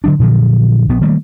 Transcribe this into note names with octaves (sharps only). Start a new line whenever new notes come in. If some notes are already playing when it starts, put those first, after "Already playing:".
D3 F#3 D4
A#2 D3 F3 F#3
A#1 B3
D#3 G3 A3 A#3